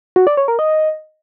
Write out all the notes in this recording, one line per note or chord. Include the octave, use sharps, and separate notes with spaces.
F#4
D5
C#5
A#4
D#5